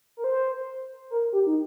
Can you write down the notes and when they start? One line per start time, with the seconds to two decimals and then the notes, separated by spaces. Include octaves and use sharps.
0.17 A#4
0.24 C5
1.10 A#4
1.33 G4
1.47 D#4